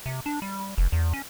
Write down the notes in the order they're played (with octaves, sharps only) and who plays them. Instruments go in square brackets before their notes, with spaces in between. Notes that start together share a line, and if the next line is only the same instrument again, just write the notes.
[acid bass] C3
D4
G3
F1
E2
C#4